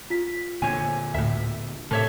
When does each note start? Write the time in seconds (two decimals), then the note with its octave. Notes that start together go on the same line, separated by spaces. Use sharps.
0.10 F4 B6
0.62 A#2 D3 C5 C#5 G#5
1.14 D2 A2 E5
1.91 A2 C3 A4 C#5 E5